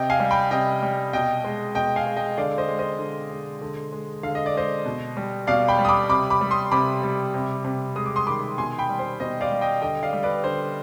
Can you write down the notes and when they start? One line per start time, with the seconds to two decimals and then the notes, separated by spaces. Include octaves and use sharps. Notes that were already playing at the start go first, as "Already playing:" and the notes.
Already playing: C3 D#5 G5
0.10 F5 G#5
0.20 G3
0.31 G5 B5
0.51 C3 D#5 G5
0.82 G3
1.13 B2 D#5 G5
1.44 G#3
1.75 B2 D#5 G5
1.96 F5 G#5
2.06 G#3
2.17 D#5 G5
2.37 D3 D5 F5
2.58 C5 D#5
2.68 G#3
2.79 C5 D#5
2.99 D3
3.31 G#3
3.61 D3
3.92 G#3
4.23 D3 F5
4.35 D#5
4.46 D5
4.54 G#3 C5 D#5
4.86 B2
5.17 G3
5.47 B2 D5 F5
5.68 G5 B5
5.79 G3
5.85 D#6
5.89 B5 D6
6.09 C3 B5 D6
6.30 B5 D6
6.41 G3
6.51 C6 D#6
6.72 C3 B5 D6
7.03 G3
7.34 C3
7.64 C3
7.96 G#3 D#6
8.06 D6
8.16 C6 D#6
8.27 D#3 B5 D6
8.58 B2 G#5 C6
8.78 G5 B5
8.89 G3
8.99 C5
9.20 B2 C5 D#5
9.41 D5 F5
9.51 G3
9.61 D#5 G5
9.82 D3 D#5 G5
10.03 D5 F5
10.13 G3
10.23 B4 D5
10.44 D3 C5